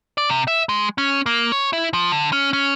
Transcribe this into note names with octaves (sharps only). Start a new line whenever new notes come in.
D5
C3
E5
G#3
C#4
A#3
C#5
E4
F3
D3
C#4
C#4